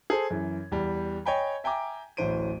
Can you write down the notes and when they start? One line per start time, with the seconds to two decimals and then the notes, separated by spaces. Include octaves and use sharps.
0.10 G#4 A4 C5
0.30 F#2 E3
0.71 E2 G3
1.26 C#5 D#5 G5 G#5 B5
1.64 E5 G5 G#5 A#5 D6
2.17 D1 A1 E3 C5 D7 D#7